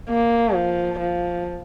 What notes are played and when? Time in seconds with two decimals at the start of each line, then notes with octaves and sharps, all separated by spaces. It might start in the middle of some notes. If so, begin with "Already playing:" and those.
0.10 A#3
0.54 F3
1.00 F3